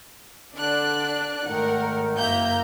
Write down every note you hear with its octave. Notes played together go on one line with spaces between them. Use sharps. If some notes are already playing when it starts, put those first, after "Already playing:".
D3 D4 D5 F#6
G#1 D#3 A3 A#4 F#5
F#1 F#2 A#3 E5 A#5 G6